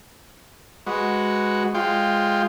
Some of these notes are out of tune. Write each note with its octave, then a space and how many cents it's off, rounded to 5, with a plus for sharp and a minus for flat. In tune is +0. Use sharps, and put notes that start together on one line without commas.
G#3 +0 F#4 +0 B4 +0
G#3 +0 F4 +0 G5 +10